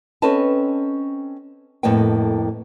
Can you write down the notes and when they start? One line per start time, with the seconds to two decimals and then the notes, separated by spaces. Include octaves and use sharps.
0.22 C4 C#4 A4 B4 D#5 A5
1.83 F2 A2 A#3 B3 D#5 G5